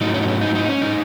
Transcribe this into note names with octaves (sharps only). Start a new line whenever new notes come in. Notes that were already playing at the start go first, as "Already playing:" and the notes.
G#2 F#3 A3 D#4
C#4
D#4
C#4
D#4
D#4
C#4
A2 G#3 D#4